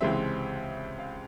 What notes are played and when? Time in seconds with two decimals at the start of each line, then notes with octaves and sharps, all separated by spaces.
0.01 C#2 C3 E3 G#3 C4 E5
0.99 F5